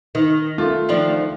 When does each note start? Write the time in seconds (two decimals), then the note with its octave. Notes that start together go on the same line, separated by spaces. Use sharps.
0.15 D#3
0.58 A3 F4
0.89 D#3 F3 D4